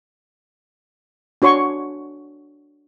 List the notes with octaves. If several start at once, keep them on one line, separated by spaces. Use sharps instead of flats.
D4 F#4 C#5 C6 C#6